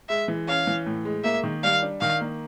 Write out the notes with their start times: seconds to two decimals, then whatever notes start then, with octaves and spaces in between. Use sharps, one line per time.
0.09 G#3 E5
0.28 E3
0.48 C#4 F5
0.67 E3
0.86 A2
1.05 G#3
1.24 A#3 E5
1.44 D#3
1.63 G3 F5
1.83 D4
2.01 D#3 F5
2.21 A#3